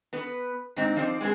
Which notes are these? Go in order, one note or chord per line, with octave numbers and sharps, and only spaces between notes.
B3 B4
G#2 C4 D#4
F3 C4 D#4 C5 D5
G#3 B3 C4 G#4